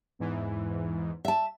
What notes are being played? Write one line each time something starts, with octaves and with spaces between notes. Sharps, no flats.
E2 G#2 E3
E5 A5